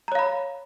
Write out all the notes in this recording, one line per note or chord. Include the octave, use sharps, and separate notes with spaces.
C#5 F5 A#5 B5